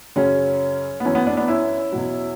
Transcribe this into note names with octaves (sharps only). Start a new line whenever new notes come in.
F#2 C#3 F#3 C#4
B3
F#2 E3 C#4
B3
B3 D4
B3 D4
C#4 E4
E2 B2 F#3